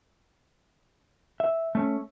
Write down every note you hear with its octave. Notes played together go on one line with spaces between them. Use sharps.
E5
A3 C#4